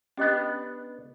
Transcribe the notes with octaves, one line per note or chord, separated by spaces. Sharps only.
B3 C#4 D4 G4 D#5